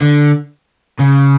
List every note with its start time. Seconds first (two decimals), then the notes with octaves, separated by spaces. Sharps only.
0.02 D3
0.99 C#3